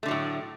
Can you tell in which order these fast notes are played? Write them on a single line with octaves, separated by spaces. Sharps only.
A3 D3 F#3 A2